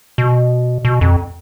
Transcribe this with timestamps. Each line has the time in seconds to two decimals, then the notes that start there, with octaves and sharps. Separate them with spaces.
0.18 B2
0.85 B2
1.01 F2